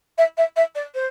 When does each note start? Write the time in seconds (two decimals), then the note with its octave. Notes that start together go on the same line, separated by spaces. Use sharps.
0.17 E5
0.37 E5
0.56 E5
0.75 D5
0.94 C5